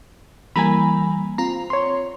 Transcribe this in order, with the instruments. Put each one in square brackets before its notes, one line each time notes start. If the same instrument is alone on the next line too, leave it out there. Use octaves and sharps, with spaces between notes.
[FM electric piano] E3 G3 A#3 [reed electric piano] G#5 A#5 B5
[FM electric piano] C4 F4 [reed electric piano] A#5
[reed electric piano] C#5 C6